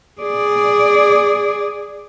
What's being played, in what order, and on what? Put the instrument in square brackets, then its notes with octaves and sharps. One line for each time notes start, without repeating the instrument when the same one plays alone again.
[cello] G#4 D5